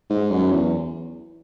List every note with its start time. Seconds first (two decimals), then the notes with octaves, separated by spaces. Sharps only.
0.10 G#2
0.31 F#2
0.52 E2